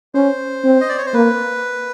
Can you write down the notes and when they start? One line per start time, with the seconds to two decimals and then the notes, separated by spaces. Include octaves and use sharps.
0.14 C#4 C5
0.64 C4
0.81 D#5
0.89 D5
0.98 C#5
1.06 C5
1.14 A#3 B4